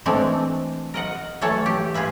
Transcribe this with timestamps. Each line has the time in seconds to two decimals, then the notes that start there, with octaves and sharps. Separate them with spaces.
0.06 E3 G#3 A3 C4 D4
0.94 A#4 D#5 F#5
1.41 E3 F#3 A3 C#5 A5
1.66 G4
1.94 F4 G#4 B4 E5